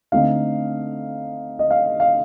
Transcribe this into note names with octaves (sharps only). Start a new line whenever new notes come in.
D3 A3 C4 D#4 F5
D#5
F5
F5